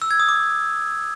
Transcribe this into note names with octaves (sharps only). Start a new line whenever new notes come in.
E6
G#6
D#6
D6